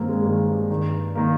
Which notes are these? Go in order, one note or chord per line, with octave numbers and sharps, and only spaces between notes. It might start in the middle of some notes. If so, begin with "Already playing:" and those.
Already playing: G2 D#3 A#3 C4
G#3
G2 D#3 A#3
G2 D#3
D#3 A#3